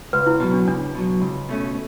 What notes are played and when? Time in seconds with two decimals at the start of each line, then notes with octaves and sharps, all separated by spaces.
0.13 C#2 B4
0.27 E4
0.40 B2 F#3
0.53 D4
0.67 C#2 D4
0.95 B2 F#3
1.22 C#2
1.49 B2 A3 C#4